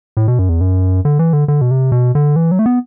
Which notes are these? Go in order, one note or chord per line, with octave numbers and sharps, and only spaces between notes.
A2
B2
F#2
E2
F#2
D3
E3
D3
D3
B2
C3
B2
D3
E3
F#3
A3
B3